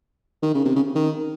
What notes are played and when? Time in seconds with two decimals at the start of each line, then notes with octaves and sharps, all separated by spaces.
0.42 D#3
0.54 C#3
0.65 C3
0.75 C#3
0.95 D#3